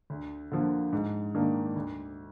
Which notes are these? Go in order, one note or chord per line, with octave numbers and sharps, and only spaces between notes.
D2
D3 F3 A#3
G#2
D#3 A#3 D4
D2